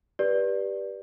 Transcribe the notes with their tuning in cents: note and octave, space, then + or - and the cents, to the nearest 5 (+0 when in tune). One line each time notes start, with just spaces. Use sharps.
G4 +0 B4 -20 D5 +0